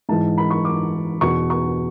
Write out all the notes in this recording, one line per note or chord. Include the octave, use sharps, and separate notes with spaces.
G#2 E3 A5
B5
C#6
D6
E2 B2 C#6
C#6